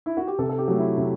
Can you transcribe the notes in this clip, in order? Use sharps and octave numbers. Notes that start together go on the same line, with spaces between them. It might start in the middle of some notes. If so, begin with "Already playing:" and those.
E4
F#4
G4
C3 A4
A4
G4
F#3 A3
E4
C3